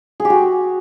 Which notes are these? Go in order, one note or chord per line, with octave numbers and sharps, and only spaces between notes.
G#4
G4
F#4